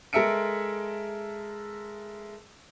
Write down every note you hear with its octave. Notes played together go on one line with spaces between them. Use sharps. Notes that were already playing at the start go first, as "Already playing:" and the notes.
G#3 A4 A#4 E5 C#7 D7